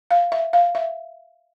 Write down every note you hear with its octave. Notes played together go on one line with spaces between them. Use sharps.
F5
E5
F5
E5